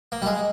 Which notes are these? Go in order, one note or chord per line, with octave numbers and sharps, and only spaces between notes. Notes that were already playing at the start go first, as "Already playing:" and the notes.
A#3
G3
G#3